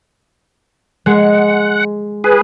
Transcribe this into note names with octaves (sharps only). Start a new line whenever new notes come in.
G#3 F#5
G#4 B4